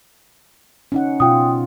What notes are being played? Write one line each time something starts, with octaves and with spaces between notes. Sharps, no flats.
C#4 D#4 F#5
B2 F4 G5 D#6